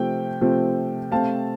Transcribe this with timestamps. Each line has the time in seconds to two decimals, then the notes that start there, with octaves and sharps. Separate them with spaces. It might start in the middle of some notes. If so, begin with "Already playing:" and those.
Already playing: C3 F3 A3 C4 G5
0.41 C3 F3 A3 C4
1.11 C3 A3 C4 F5 A5